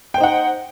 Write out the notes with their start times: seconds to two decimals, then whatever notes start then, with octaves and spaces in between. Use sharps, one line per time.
0.14 G5
0.17 C5
0.20 D#4
0.23 F#5